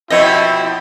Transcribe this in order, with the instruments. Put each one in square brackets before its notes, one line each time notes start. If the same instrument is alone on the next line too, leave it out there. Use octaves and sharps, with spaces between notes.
[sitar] B2 F3 C4 [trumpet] E4 [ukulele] C#5 D#5